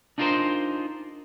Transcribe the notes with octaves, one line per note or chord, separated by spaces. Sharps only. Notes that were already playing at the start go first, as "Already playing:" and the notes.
D4 D#4 F4 G#4 A#4 C5